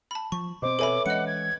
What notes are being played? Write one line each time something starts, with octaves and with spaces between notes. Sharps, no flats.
A5 B5
F3 C#6
B2 C4 C5 D#5 D6
A4 B4 C#5 E5 G#5 B5
E3 G#3 C#4 D#5 F#5 C#7
G#6